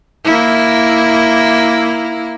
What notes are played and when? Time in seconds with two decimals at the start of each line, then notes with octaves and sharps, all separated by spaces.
0.25 A#3 E4